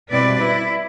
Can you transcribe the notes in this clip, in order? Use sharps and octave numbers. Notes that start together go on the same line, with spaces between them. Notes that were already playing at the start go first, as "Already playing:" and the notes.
B2 G3 C4 E4 B4 D5
E4